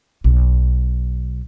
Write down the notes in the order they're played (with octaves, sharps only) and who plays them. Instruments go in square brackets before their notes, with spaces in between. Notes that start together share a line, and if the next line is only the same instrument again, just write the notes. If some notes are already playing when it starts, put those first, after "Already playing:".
[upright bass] B1